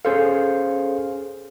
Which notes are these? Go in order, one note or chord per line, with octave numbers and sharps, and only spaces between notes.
C#4 G#4 A4 C5 F5